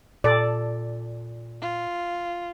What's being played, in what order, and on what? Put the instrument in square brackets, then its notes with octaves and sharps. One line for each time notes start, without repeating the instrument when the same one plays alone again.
[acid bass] A#2 [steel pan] A4 D5
[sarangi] F4